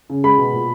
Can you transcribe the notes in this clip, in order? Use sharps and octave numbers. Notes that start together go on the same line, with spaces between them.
C#3
G#3 B5
B2
A#2